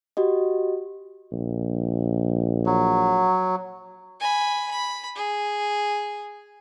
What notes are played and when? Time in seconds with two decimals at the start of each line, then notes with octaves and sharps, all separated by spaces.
0.17 F#4 G4 D#5
1.32 A#1
2.66 F#3
4.20 G#5 B5
4.71 B5
5.16 G#4